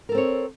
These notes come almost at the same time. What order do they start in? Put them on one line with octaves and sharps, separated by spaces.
A#4 A4 C4 C#5